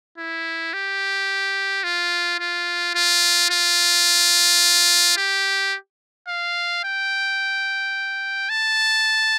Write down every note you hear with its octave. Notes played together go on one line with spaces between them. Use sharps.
E4
G4
F4
F4
F4
F4
G4
F5
G5
A5